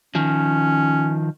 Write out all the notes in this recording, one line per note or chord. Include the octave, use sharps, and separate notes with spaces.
D#3 F3 C#4